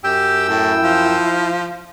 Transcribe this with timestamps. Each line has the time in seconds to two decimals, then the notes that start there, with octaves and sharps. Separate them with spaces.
0.04 F#2 G4 G5 E6
0.49 A2 E4
0.83 F3